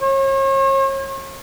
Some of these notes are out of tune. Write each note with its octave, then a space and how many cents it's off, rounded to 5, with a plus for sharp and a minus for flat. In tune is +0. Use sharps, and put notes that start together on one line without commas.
C#5 -40